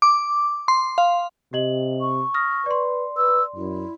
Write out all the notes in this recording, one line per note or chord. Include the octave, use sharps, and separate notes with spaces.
D6
C6
F5
C3 G4 D#5 F#7
C#6
D#6 F6 A#6
B4 D5 C6
B4 E6
F#2 E4